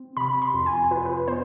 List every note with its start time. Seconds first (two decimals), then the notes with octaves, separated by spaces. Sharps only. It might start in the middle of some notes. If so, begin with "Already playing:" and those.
Already playing: C4
0.17 C3 B5
0.42 C6
0.54 F2
0.66 G#5
0.91 F4 B4
1.05 B4
1.28 B3 C5